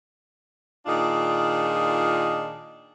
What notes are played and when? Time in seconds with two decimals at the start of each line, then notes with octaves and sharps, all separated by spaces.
0.86 A#2 D#3 D4 D#4 F4 G#4